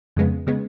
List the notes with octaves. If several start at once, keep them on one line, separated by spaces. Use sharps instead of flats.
F2 C#3 G#3 B3
C#3 G#3 B3